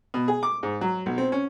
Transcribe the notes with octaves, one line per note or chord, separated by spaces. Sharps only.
B2
G#4
D6
G#2
F#3
B1
C4
C#4